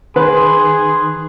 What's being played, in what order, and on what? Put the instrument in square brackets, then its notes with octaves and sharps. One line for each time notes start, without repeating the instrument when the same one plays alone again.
[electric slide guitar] D#3 [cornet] G#4 [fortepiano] B4 [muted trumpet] C6